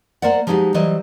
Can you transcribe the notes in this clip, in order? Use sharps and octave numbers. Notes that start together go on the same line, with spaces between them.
A#3 A#4 C5 D5 F#5
F3 G3 G#3 D#4 F#4 G4
E3 F#3 G3 C5 D#5